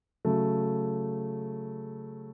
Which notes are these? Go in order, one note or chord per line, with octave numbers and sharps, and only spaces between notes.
C#3 F#3 A3